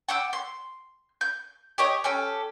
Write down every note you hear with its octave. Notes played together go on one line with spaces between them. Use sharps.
F#5 G5 D6 E6
C6
G6
G4 C#5 D#5 G5
C#4 G4 A4